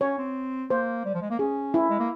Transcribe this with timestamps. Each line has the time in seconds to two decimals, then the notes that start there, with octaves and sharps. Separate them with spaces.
0.01 C#4 C#5
0.18 C4
0.70 A#3 C5
1.05 G3
1.14 F3
1.22 G#3
1.30 A#3
1.39 C#4 G#4
1.74 E4
1.90 G#3
1.99 A#3